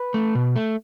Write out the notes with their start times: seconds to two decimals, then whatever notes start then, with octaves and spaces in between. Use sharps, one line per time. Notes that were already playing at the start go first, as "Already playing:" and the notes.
Already playing: B4
0.14 A3
0.35 B2
0.56 A3